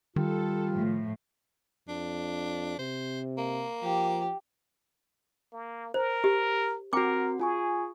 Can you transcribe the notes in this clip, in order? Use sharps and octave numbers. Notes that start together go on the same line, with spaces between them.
D#3 G3 F4 A4
A2 F3
F2 D4
C3 C5
A#3
F3 G4
A#3
A#4 C5
G4
C4 F#4 A#4 G5 D6
F4 G#4 G#5 C#6